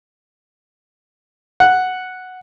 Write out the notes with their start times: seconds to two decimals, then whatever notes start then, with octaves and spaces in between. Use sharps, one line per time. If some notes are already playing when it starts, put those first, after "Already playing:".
1.60 F#5